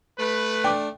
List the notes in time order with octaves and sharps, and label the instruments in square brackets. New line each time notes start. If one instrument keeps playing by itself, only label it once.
[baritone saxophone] A3 [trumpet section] B4
[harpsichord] D4 [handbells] G5 D6